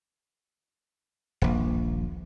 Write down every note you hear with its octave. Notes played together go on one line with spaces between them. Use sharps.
D#1 A#1